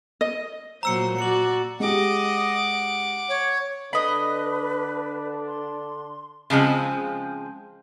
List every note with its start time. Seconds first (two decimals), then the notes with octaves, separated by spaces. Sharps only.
0.21 D#5
0.83 A#2 F#3 C5 A#5 E6 C#7
1.19 F#4 D5 C#7 F#7
1.80 G#3 G4 D#5 F#5 D6
3.28 C#5
3.93 D3 D4 B4 D#5 B5
5.47 C6
6.50 C#3 F3 G#3 C4